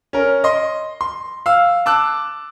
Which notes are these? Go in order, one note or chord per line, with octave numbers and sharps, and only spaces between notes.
C#4 A#4
D#5 C6
C6
F5 E6
A5 D6 E6 F#6